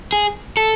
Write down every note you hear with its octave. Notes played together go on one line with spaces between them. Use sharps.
G#4
A4